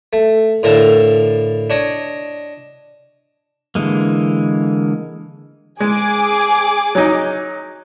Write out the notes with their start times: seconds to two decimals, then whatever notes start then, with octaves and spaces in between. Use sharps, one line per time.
0.13 A3
0.63 A2 D3 A#4 F5 A5
1.70 D4 C#5 D#5
3.75 D3 E3 G#3 A#3
5.80 G#3 G#4 G#5 D6
6.95 F#3 D#4